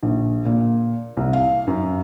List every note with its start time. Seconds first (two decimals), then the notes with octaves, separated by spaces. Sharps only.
0.03 A#1
0.45 A#2
1.17 C2
1.33 F5
1.67 F#2